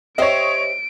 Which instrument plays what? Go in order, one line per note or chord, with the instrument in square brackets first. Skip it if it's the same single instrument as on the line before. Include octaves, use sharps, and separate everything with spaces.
[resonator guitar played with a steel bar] G4 C5 E5 [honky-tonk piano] C#5 D#5 [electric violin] D7